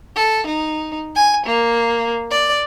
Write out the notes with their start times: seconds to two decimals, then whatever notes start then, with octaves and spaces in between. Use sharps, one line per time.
0.16 A4
0.47 D#4
1.15 G#5
1.45 A#3
2.30 D5